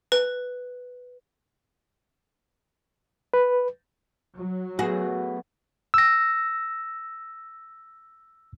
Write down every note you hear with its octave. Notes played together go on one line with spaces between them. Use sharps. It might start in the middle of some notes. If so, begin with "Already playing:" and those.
B4
B4
F#3
A3 B3 F#4 G#4
E6 A#6